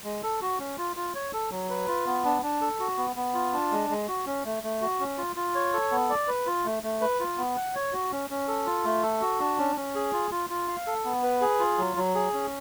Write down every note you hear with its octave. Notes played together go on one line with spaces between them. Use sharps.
G#3
A4
F#4
C#4
F4
F4
C#5
A4
F#3
B4
F4
B3
D4
D4
A4
F#4
B3
B3
F4
D4
G#3
G#3
F#4
C#4
A3
A3
F#4
C#4
F4
F4
C#5
A4
B3
D5
B4
F4
A3
A3
B4
F4
B3
F#5
C#5
F#4
C#4
C#4
A4
F4
A3
A4
F#4
D4
C#4
C#4
G#4
F4
F4
F4
F5
A4
B3
B4
G#4
F4
F#3
F#3
G#4
C#4